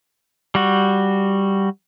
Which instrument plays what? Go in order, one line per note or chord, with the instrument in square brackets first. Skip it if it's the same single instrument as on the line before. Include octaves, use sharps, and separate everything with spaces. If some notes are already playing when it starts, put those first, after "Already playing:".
[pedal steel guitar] G3 F#4